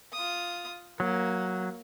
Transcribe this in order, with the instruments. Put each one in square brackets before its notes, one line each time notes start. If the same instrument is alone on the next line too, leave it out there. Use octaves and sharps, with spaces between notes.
[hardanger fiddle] F4 D#6
[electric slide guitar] F#3 [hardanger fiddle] A#3